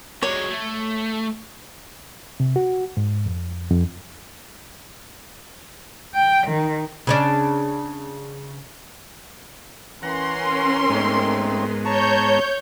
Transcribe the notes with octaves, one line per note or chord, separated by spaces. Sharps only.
F#3 G#3 C#5
A3
C3
F#4
G#2
F2
F2
G5
D#3
C#3 C#4 D4
E3 C#4 A#4 F#5 A#5 C6
G#2 G#3 A3 B3 C4 D#4
C#5 A5 A#5 C#6 G6